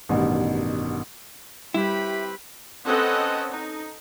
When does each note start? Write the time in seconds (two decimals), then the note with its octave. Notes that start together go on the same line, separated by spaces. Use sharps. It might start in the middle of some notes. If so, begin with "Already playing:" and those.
0.09 A1 G2 B2 D#3
1.74 G3 C4 E4 G4 B4 B5
2.84 C4 C#4 A4 B4 D#5 F#5
3.49 D#4